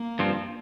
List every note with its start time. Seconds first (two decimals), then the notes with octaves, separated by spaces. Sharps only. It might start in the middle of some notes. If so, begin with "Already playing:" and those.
Already playing: A#3
0.19 G2 F3 C4